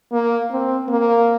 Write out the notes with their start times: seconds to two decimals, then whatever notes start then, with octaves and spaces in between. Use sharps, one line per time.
0.12 A#3
0.51 C4
0.89 A#3